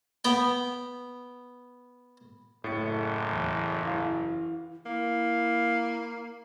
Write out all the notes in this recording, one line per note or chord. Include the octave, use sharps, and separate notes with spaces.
B3 G5
F#1 A2 A3 A6 C#7
E2
E3 F5
A#3 E4